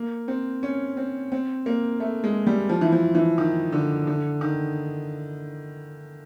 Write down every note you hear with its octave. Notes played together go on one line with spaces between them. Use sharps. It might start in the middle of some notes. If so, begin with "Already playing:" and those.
Already playing: A#3
C4
C#4
C4
C4
A#3
A3
G#3
G3
F3
E3
F3
E3
D#3
D3
D3
D#3